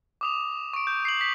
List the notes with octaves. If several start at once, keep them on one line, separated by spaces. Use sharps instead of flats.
D6 D#6 F7
C#6 D7
G6
C7 F#7
B6